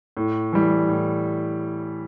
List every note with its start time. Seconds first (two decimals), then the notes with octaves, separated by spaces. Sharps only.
0.17 A2
0.53 E3 G3
0.89 A2